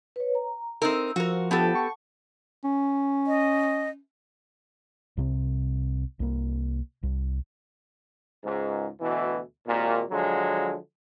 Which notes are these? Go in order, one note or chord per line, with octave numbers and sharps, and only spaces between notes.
B4 C#5
A#5
C4 D#4 A#4 E6
F3 F#4 A#4
F3 B3 G4 A4 F#5 G5 A5
C#6
C#4
D#5
C2 C3 C4
C2 A#3
C2
C#2 G#2
D2 B2 E3
G#1 D#2 A#2
D3 F3 F#3 G#3